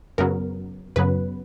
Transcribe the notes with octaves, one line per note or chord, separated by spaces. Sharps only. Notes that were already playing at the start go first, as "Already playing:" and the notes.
F#2 C#3 F#3 B3 A#4
F#2 C#3 F#3 B3 B4